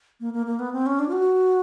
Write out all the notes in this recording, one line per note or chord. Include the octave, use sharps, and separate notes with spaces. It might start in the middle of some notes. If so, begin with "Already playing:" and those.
A#3
A#3
A#3
B3
C4
C#4
D4
F4
F#4